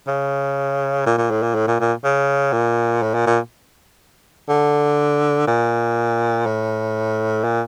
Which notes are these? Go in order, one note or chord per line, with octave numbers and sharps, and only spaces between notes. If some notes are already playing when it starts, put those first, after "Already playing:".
C#3
A#2
A#2
A2
A#2
A2
A#2
A#2
C#3
A#2
A2
A#2
A#2
D3
A#2
A2
A#2